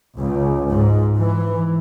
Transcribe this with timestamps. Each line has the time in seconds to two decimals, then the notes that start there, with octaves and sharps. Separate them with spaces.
0.18 C#2
0.69 G#2
1.18 E3